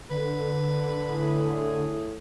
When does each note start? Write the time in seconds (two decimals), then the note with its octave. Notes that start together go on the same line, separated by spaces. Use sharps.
0.10 D3 B4
1.08 A2 E4 G#4